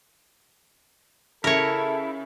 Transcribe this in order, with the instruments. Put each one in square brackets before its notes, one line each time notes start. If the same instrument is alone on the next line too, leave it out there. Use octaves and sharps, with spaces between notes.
[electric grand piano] C#3 E5 [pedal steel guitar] E4 [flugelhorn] A4 [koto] A#4 C#5